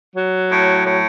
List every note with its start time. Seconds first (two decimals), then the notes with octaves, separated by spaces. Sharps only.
0.14 F#3
0.50 A2
0.86 A2